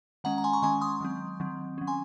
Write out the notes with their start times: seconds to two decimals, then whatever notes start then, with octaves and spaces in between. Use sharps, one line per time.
0.24 D#3 G#3 C#4 F#5 A#5
0.38 A#5
0.44 G#5 C6
0.53 A#5 C#6
0.62 D#3 G#3 C#4 G#5 C6
0.82 C6 D#6
1.01 D#3 F#3 C4
1.40 D#3 F#3 C4
1.78 F#3 C#4
1.87 G#5 C6